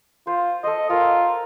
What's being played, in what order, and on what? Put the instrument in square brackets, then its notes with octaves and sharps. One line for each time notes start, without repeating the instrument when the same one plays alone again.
[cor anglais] F4 [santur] C5
[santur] A4 C5 [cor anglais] D#5
[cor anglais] F4 [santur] A#4 G5